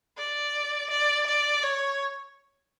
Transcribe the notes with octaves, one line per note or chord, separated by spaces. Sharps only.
D5
D5
D5
C#5